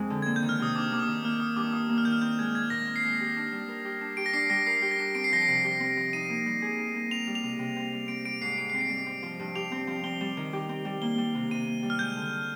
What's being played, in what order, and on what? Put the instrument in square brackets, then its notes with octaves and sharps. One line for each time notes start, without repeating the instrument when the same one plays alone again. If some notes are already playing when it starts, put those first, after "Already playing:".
Already playing: [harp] F2 G#3 C4
D3
[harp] A#3 [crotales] G#6
[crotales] G6
[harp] D#3
[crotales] F6
[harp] C3 [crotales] D#6
[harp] D4 [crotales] D6
[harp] A#3 [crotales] D6
[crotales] D#6
[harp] D#3
[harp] A#3 [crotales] F6
[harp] D#3 [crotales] D#6
[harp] G2 [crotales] D6
[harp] F4 [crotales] D#6
[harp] A#3
[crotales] F6
[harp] D#3 [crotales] G6
[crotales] F6
[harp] C4 [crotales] G6
[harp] G#3 [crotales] G#6
[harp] A#2 [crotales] G#6
[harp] A#2 [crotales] A#6
[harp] C4
[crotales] C7
[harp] G#3
G4
D4
G3
A#4
G4
D4
[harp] G4 [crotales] D7
[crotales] A#6
[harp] D4 [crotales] C7
[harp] G3 [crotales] A#6
[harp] A#4 [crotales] C7
[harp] G4
[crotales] A#6
[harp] D4
[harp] C4 [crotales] D7
[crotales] C7
[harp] F3 [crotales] A#6
[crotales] C7
[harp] C3
G4
C4
F3
[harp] D#4 [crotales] D#7
[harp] A#3
G3
G#4
D#4
A#3
[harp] C4 [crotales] F7
[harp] G3
[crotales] F7
[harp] C3
C3
C4
G3
[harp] C4 [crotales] D7
[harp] G3 [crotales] D7
[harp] G#2 [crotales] C7
[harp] G#2 [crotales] D7
[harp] C4 [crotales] C7
[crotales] D7
[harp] G3
C4
F3
G2
[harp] G4 [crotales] F7
[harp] C4
F3
[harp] C4 [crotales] G7
[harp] G3
D#3
G4
C4
G3
[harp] A#3 [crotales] G7
[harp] G3
C3
[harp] C3 [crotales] D#7
[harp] A#3
G3
[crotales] F6
[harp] G#3 [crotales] G6
[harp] D3